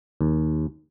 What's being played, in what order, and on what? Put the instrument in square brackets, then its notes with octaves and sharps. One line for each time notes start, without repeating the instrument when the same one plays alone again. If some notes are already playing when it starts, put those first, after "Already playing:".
[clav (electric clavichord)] D#2